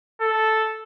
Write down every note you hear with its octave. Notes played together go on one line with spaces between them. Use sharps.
A4